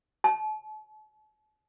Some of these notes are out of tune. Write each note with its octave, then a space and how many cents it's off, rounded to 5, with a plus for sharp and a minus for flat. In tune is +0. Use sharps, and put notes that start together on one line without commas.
A5 -45